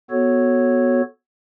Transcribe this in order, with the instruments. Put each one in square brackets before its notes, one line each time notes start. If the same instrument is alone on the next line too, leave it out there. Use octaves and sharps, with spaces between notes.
[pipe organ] B3 F#4 A4 C#5